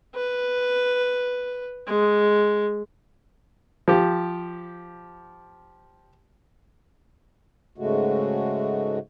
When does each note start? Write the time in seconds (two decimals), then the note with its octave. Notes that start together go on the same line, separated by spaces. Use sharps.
0.15 B4
1.88 G#3
3.88 F3 G4
7.78 G#2 C#3 G#3 A3 F#4